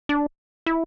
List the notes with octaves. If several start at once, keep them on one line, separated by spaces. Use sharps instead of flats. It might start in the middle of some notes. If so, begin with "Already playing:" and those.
D4
E4